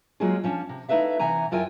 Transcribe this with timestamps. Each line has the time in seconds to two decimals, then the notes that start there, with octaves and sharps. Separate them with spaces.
0.20 F#3 G#3 A#3 F4 F#4 G#4
0.44 F3 C#4 D4
0.69 C3
0.89 A3 D#4 E4 B4 E5 F5
1.19 C3 E3 F#5 G#5 A#5
1.51 F#2 E4 F4 A#4 G5 G#5